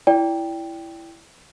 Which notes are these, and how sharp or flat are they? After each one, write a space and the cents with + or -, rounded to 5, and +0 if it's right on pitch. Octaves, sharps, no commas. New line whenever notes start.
E4 +10 D5 -20 G5 +0